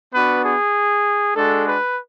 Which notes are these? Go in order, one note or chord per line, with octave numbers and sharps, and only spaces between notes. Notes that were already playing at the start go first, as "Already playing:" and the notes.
B3 D4 F#4 B4
G#4
G#3 D4 F#4 A4
B4